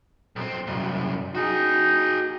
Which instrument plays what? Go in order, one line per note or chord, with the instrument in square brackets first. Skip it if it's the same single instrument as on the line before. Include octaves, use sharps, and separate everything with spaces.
[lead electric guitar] B1 C4
C2 F#2
[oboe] D#4 [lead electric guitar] F#4 G#4